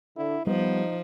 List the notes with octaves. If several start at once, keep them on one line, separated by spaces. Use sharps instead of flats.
D3 E4
F3 G3 B3 D#4